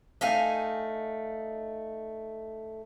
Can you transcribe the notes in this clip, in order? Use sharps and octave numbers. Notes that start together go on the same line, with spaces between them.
A3 D#4 F5 G#5